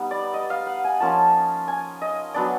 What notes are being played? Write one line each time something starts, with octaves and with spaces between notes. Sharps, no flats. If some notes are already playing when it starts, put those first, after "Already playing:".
Already playing: G3 B3 D#4
D5
D#5
F5
F#5
G#5
F3 A#3 C#4 F4 A5
G#5
D#5
F#3 B3 D4 D5